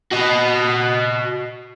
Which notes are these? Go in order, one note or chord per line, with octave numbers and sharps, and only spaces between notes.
F#4 D#5